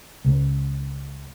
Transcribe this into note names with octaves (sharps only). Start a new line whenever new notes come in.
C#2